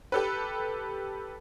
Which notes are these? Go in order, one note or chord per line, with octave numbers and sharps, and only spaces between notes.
G4 A4 B4